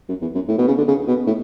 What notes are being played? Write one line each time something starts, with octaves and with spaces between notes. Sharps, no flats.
F#2
E2
F#2
A2
B2
C#3
D3
C#3
B2
A2